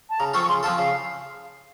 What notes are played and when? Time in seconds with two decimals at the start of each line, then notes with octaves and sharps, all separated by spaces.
0.10 A5
0.19 C#3 A#5
0.34 F3 C4 F4 A4 C#6
0.44 C#6
0.49 C#3 C6
0.63 F3 C4 F4 A4 A5
0.78 C#3 F5